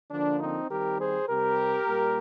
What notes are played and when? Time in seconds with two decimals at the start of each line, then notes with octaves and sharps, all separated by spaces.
0.11 D3 F3 A#3 D4
0.41 C4 D#4
0.70 D#3 G3 C4 G4 A#4
0.99 G#4 C5
1.29 C3 G3 C4 G4 A#4
1.88 A#2 G3 A#3